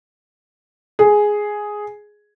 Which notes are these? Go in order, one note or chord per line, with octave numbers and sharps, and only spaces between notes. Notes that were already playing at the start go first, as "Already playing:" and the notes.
G#4